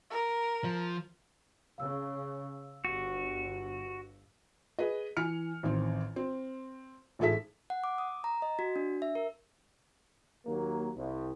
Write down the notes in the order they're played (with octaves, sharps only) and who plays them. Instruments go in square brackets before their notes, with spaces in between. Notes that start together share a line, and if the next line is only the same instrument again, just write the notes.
[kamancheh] A#4
[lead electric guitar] F3
[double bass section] C#3 [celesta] F5 E6
[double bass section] G1 [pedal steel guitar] F#4
[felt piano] G#4 B4 D#5
E3 G#5 F6 C#7
A1 D#3 C4
C4
A1 G#2 G#4 A4 E5 B6
[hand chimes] F#5
D6
D#6
A#5
D#5
F#4
D4
E5
A#4
[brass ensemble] D#2 F#3 A#3
C2